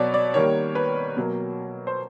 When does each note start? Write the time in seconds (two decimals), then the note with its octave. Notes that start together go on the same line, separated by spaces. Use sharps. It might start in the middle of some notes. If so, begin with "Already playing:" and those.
Already playing: B2 F#3 B3 C#5 D5
0.14 D5
0.34 D#3 G3 A#3 C#5
0.75 B4
1.17 B2 F#3 A#3
1.87 C5